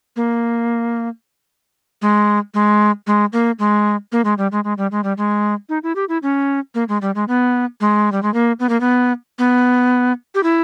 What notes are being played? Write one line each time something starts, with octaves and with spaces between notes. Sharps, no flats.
A#3
G#3
G#3
G#3
A#3
G#3
A#3
G#3
G3
G#3
G#3
G3
G#3
G3
G#3
D#4
E4
G4
E4
C#4
A#3
G#3
G3
G#3
B3
G#3
G3
G#3
A#3
B3
A#3
B3
B3
G4
E4